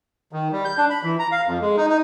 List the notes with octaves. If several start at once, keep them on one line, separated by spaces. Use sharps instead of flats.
D#3
G3
G6
D4
B5
E3
A#5
F5
F2
G#3
D#4
D#4